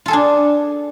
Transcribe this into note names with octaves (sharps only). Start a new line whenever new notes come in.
D4 F4 G#4 A4